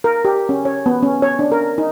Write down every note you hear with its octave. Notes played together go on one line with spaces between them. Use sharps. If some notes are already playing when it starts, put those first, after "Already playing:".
A#4
G4
C#4
C#5
B3
C#4
C#5
D4
A#4
D#4